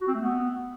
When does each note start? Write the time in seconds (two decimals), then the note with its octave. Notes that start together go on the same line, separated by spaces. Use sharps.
0.01 F#4
0.08 C4
0.14 A3
0.21 B3